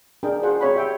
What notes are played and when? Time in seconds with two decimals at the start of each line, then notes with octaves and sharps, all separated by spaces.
0.23 D4 G#4 A#4 D#5 G5
0.42 F4 F#4 G#4 C5 F#5
0.61 C4 C#5 B5
0.76 G4 E5 G5 G#5